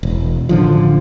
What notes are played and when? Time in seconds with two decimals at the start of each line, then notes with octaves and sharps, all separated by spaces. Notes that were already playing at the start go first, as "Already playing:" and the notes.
0.03 E1
0.49 A1 D3 F3